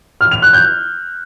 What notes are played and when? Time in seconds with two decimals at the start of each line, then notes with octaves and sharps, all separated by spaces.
0.21 F6
0.31 F7
0.42 F#6
0.53 G6